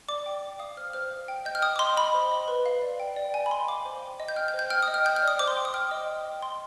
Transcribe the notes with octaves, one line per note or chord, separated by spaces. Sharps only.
D5 D6
G5
D5
F5 D#6
C5 F6
C5 F6
F5
G5
D#5 G6
F6
G5 D#6
D6
D#5 C6
D#5 B5
C5
D#5
B4
F5
D5
G5
D5
G5 G#5
B5
D#5 C6
F5 D6
C5
G5
D#5
G6
G5 F6
G6
C5
G6
G5 F6
D#6
D#5
F6
G5 G6
F6
D5 D#6
C5 D6
C6
G5
D#6
G5 F6
D#5
G5
D#5
G5 C6